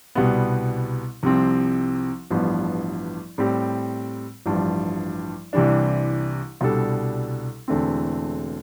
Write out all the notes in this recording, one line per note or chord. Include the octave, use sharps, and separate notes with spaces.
C2 B2 G3 B3
C2 C3 F3 C4
A1 G2 F3 B3
A2 G3 C4 G4
A1 G2 F3
C2 C3 E3 G3 D4
C2 B2 G3 D4 A4
E1 E2 D3 A3 C4